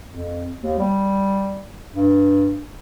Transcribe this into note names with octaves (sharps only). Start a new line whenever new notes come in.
F2
D#2
G3
G2